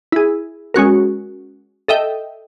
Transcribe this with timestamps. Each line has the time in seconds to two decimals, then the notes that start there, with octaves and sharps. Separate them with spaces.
0.12 E4 G#4
0.74 G#3 C#4 F#4 A#4
1.88 A4 D#5 E5 G5